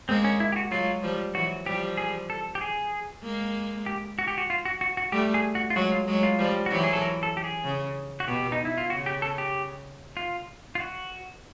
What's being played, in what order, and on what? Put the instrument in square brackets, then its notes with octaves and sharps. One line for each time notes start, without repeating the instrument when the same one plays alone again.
[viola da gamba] G#3 A#3 [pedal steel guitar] C4
[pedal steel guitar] C#4
E4
G4
F#4
[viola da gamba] F#3 G#3 [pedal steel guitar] F4
[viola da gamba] F3 G3
[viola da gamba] E3 F#3 [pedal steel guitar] F#4
[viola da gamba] F3 G3 [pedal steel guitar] G4
[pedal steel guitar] G#4
A4
G4
G#4
[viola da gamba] G#3 A#3
[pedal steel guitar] G4
F#4
G4
F#4
F4
F#4
F#4
F#4
[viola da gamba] G3 A3 [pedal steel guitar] G4
[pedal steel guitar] G#4
F#4
F4
[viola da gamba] F#3 G#3 [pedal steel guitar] F#4
[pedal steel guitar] F4
[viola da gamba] F#3 G#3
[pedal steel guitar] F4
[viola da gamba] F3 G3
[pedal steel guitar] F#4
[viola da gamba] E3 F#3 [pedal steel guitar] G4
[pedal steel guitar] G#4
A4
A#4
A4
G4
G#4
[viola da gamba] C#3
[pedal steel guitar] F#4
[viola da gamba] B2 [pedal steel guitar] G4
[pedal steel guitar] D#4
E4
F4
[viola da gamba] C#3 [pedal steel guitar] F#4
[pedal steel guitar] G4
A4
G4
F4
F4
F#4